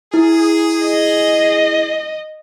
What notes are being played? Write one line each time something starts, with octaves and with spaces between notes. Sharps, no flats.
E4 G#4
D#5